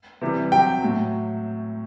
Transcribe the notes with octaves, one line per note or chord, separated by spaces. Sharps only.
C3 E3 G3
C3 F#3 G5
A2 F#3